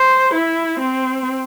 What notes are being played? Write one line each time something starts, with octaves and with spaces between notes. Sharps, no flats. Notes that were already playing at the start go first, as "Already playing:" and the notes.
Already playing: C5
E4
C4